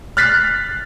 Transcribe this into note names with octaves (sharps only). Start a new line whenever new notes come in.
F6 F#6 A6 B6 C7